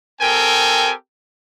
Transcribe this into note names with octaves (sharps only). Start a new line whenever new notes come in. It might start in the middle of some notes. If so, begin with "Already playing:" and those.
C4 G4 A4 A#4 G5 G#5